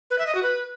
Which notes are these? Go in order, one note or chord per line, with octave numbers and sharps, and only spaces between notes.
B4
E5
D#5
F#4
B4